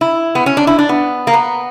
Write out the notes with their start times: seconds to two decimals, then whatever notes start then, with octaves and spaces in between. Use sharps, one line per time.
0.01 E4
0.35 B3
0.46 C#4
0.57 D4
0.67 E4
0.79 D4
0.89 B3
1.27 A#3
1.34 B3